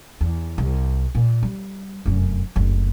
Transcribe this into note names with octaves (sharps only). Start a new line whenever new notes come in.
E2
C2
A#2
G3
F1 F#2
F#1 D2